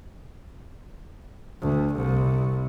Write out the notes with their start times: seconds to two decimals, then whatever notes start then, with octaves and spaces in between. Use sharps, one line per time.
1.62 D2
1.95 C2